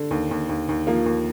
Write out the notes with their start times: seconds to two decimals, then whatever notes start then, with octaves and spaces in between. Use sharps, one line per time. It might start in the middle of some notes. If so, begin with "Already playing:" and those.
Already playing: D3
0.11 D#2
0.31 D#2
0.49 D#2
0.69 D#2
0.87 F3 A#3
1.06 D#2